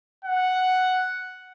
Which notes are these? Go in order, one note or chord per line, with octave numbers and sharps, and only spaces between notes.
F#5